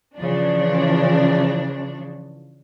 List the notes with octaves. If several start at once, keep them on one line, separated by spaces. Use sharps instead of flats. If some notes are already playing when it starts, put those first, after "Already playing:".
C#3 E3 F3 D4